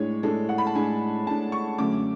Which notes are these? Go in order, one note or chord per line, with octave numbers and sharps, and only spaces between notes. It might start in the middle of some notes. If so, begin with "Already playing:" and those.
Already playing: A2 G#3 D4 C#5
A2 G#3 D4 A4
F#5
B5
A5
A2 G#3 D4 G#5
A2 G#3 D4 A5
C#6
F#2 D3 A3 C#4 D6